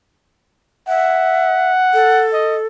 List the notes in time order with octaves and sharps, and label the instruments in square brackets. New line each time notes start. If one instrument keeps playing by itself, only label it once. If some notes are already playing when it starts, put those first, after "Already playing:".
[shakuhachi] E5 [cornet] F#5
[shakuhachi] A4
[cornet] D#5